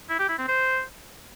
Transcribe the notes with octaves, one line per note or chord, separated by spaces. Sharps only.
E4
G4
E4
C4
C5